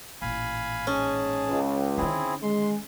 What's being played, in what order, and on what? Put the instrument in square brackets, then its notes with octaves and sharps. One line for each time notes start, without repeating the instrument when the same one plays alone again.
[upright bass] A1 A#2 [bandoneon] F5 G#5 B5
[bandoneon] G#2 G#4 A5 [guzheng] C#4
[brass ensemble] C#2
[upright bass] D3 D#3 [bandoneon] C4 E4 G#4
[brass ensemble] G#3 [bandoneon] C6